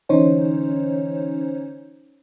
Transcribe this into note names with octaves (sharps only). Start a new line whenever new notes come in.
D3 E3 C#4 D#4 C5 C#5